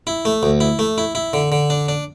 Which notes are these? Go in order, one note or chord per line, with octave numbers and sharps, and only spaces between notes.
E4
A3
D2
E4
A3
E4
E4
D3
D3
D4
D4